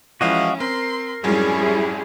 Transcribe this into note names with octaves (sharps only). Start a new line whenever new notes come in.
E3 F3 G#3 C#4 E4 F#4 D#5 F5
C4 A#4 C6
F2 G#2 F#3 G3 C#4 E4 G#4